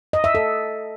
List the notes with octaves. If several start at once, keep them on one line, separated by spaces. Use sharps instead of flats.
D#5
E5
A4